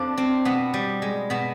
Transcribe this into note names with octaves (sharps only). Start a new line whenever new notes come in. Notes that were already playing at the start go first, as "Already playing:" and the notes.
Already playing: F2 F3 D4
C4
B2 B3
G3
G#3
B2 B3